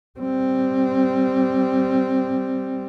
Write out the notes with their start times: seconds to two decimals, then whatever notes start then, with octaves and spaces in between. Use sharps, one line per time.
0.19 G3 C4